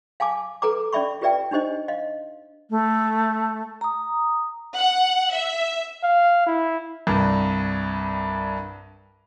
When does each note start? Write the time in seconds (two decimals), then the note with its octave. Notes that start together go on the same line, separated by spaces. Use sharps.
0.20 F5 G#5 A5 D6
0.62 A4 B4 A#5 D6
0.93 C#4 D5 E5 B5 C#6
1.21 F4 G4 B4 D5 E5 G5
1.51 D4 D#4 G4 C5 D#5
1.88 D#5 F5
2.70 A3
3.81 A#5 D#6
4.77 F#5
5.32 E5
6.04 F5
6.47 E4
7.07 C2 G2